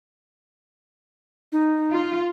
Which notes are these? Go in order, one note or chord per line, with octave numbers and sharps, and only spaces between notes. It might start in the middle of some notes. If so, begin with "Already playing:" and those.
D#4
F4